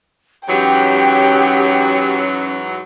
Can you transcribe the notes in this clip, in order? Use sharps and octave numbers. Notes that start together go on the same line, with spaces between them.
G#2 E3 F#3 C#4 G4 G5